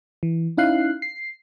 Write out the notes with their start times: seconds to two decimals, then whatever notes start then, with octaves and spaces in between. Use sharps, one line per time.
0.23 E3
0.57 C#4 D#4 E4 F5 F#6 C7
1.02 C7